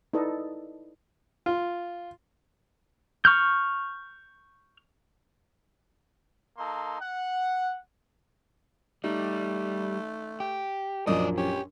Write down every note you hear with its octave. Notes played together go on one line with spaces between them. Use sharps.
D#4 E4 A4 B4 D5 D#5
F4
C#6 F6 G6
A#3 D#4 A4 C6
F#5
G3 A3 D#4
G4
A#1 F#2 F3 C#4 D5 D#5
C#4 G4